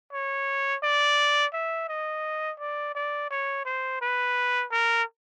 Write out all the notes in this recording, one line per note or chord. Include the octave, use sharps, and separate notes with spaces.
C#5
D5
E5
D#5
D5
D5
C#5
C5
B4
A#4